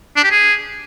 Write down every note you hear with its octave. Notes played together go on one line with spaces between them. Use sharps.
D4
G4
G#4